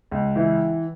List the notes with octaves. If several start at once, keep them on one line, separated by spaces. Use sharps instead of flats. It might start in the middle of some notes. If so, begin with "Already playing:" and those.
C#2
E3